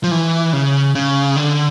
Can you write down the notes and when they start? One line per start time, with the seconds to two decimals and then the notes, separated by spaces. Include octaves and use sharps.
0.04 F3
0.11 E3
0.53 C#3
0.95 C#3
1.36 D3